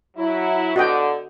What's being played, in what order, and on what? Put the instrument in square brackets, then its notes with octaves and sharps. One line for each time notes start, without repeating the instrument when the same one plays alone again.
[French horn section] F#3 E4
[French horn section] D3 [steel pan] F#4 D#5 G5